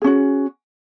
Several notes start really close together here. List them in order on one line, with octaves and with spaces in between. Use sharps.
G#4 C#4 F#4